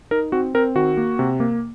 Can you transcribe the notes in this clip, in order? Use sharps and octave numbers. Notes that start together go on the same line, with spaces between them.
D#4 A#4
C4 F#4
C4 A#4
D#3 F#4
A#3
C3
A#3